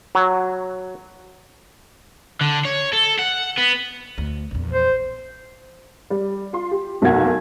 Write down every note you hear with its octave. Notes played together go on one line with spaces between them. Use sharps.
F#3
D3
C#5
A4
F#5
B3
D2
A#1 E2
C5
G3
F4 C6
G4
F1 B1 B2 A#3 F#4 G#6